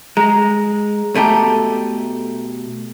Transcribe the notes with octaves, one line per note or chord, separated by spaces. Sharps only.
G#3 A#5 A#6
B2 A3 G4 A4 A5 A#5